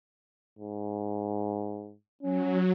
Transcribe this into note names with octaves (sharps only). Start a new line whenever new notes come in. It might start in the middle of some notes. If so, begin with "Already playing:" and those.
G#2
F#3 C#4